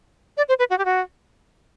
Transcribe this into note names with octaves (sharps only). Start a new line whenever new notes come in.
D5
C5
B4
F#4
G4
F#4